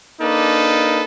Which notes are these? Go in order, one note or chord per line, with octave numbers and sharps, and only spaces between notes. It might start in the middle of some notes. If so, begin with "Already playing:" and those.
A#3 D4 D#4 A4 B4